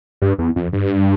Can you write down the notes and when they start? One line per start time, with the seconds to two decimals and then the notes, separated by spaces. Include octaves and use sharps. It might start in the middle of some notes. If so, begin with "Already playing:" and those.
0.22 G2
0.39 E2
0.56 F2
0.73 G2